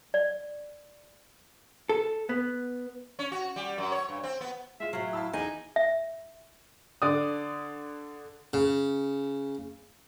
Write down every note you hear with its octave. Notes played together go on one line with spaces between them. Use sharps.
D5
A4
B3
C#4
F#4
G3
F#2
C#5
G2
C4
B3
G#3 F4 E5
A2 F#3 F5
E4 F5 A5 E6
E2 D#4 G#4 G#5
E5
D3 D5 D#6
C#3